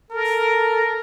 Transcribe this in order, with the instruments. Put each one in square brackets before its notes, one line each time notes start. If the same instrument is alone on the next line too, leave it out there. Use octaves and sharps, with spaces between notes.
[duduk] A4 [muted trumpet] A#4